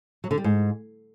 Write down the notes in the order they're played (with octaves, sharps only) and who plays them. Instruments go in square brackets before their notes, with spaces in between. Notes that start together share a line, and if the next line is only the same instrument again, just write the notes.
[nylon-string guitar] F#3
D3
G3
G#2